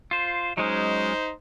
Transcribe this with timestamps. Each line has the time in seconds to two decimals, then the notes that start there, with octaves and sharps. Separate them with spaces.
0.11 F4 C5
0.57 F#3 G#3 C#4 D#4 C5